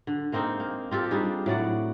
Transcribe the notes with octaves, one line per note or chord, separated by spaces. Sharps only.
D3
G#3 A#3 C4 D#4
A#3
C4 F4 G4 A4
G3 D4 D#4 G#4
A2 F#3 D5 F#5